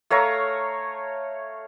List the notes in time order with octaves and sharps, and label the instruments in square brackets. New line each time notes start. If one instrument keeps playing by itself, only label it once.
[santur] A3 C#5 F5 A#5